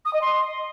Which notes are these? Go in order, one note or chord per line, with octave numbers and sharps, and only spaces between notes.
D#6
D#5
C6